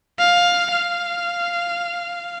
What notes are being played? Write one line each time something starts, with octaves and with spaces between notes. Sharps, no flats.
F5
F5